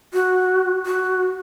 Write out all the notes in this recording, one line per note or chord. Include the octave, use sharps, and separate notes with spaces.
F#4
F#4